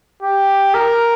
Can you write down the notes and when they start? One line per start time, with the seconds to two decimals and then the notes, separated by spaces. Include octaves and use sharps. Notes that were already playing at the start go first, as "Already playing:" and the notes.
0.22 G4
0.74 A#4